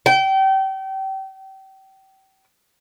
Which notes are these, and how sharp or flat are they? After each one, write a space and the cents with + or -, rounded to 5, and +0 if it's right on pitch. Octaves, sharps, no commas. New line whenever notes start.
G5 -30